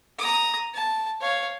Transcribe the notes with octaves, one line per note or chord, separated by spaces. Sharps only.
A#5 D#6
A5
C#5 F5